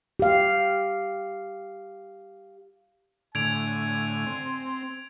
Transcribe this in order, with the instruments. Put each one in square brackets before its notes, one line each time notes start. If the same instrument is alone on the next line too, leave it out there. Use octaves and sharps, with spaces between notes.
[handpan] G4 F5
[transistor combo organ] A2 D3 [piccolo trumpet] G#5 [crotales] G#6 D7 F7
[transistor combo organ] C4